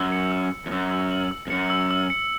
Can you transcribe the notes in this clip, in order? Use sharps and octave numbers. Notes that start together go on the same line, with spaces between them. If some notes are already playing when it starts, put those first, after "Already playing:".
Already playing: F#2 E6
C#7
E6
E6
E2
F#2 E6
E6
F#7
E6
E2
F#2 C#7
E6
E6
C#7